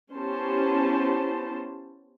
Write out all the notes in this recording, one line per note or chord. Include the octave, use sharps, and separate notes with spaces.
B3 C#4 E4 G4 C5 A5